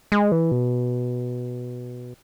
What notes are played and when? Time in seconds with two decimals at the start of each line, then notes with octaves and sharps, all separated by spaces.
0.12 G#3
0.32 E3
0.52 B2